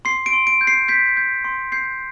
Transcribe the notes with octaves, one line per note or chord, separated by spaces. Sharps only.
C6 C7
D7
C6
D7
G6
C7
G6 B6
G6
C6
G6 C7